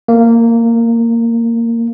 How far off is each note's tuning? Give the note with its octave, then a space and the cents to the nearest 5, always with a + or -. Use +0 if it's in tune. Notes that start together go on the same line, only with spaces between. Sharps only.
A#3 -15